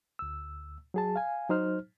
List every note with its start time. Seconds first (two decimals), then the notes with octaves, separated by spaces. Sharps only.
0.19 D2 E6
0.94 F#3 G#4 A5
1.16 F5 G#5
1.49 F#3 D#4 C5 F6